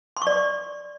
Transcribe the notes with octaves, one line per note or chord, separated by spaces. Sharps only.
C6
C#6
D5
C#6
D5